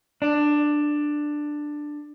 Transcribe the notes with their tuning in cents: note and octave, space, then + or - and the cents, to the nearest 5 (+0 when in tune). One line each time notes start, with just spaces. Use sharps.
D4 +10